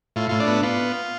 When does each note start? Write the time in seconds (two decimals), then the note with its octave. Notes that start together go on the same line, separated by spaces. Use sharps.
0.16 A2 F4
0.29 A2 F4
0.40 D4
0.47 B3
0.63 B3 F4